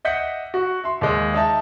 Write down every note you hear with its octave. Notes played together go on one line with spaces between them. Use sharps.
D#5 E5 F#5 G6 B6 C#7
F#4
E5 C6
D#2 G#3
D#4 E5 F5 A5